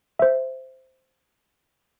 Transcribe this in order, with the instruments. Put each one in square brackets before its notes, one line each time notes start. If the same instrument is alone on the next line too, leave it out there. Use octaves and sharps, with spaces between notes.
[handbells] C5 E5